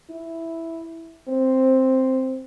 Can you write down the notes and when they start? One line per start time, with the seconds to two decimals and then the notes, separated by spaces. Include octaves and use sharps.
0.10 E4
1.29 C4